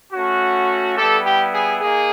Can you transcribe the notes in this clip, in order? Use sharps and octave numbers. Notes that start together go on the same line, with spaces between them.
A3 C#4 F#4
G3 B3 E4 G4 A4
G4
G#4
A#3 D#4 G#4